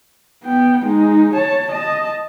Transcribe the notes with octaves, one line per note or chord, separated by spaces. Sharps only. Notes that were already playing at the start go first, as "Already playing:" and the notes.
B3 G5
G#3 D#4
C#5 A5
D#5 A5